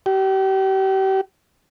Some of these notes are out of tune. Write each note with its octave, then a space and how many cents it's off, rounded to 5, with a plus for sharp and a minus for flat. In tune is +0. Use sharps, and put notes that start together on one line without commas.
G4 -35